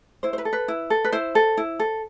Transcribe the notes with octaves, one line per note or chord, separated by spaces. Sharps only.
E4 C5
C5
B4
A4
B4
E4
A4
B4
E4 C5
A4
E4
A4